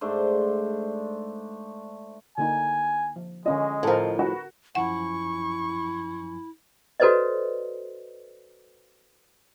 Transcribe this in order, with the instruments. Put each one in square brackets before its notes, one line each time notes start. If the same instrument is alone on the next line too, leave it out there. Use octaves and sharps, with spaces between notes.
[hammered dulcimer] G#2 A3 D4 C5
[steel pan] D3 A#3 D#4 [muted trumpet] G#5
[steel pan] F3
[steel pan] D3 C#4 F4 [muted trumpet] G#3 [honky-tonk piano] D#5
[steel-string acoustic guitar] A2 F3 [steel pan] A4 A#4
[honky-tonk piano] F#4 [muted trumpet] B4
[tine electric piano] F#2 F3 G#5 [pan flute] E4 [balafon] F#5 [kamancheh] C#6
[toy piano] F#4 A4 B4 C5 D5 D#5